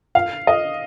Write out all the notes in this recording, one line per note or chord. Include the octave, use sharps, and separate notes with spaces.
F5
D#5